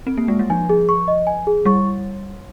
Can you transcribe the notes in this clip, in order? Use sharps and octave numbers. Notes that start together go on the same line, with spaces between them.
C4
A#3
G#3
G3
F3 G#5
G#4
C#6
D#5
G#5
G#4
G3 C#6